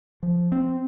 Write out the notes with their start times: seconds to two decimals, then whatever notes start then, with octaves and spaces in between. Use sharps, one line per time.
0.23 F3
0.52 C4